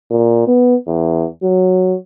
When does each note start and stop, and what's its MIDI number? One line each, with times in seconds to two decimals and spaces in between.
0.11 0.45 46
0.48 0.76 59
0.87 1.26 40
1.43 1.96 54